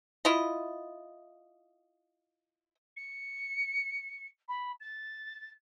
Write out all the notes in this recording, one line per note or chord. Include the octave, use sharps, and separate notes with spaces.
E4 F4 D#5
C#7
B5
A6